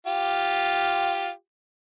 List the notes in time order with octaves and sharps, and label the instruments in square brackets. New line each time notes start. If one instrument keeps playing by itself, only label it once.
[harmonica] F4 G4